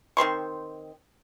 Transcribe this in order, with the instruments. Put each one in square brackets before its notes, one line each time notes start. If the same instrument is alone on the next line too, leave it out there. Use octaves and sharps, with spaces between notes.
[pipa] D#3 C4 C6 C#6